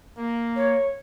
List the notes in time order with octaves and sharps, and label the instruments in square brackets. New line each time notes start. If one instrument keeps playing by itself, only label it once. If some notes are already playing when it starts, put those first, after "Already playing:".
[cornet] A#3
[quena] C#5